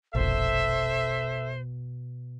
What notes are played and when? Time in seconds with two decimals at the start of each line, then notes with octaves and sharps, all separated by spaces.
0.15 F1 A#1 B2 A4 C5 E5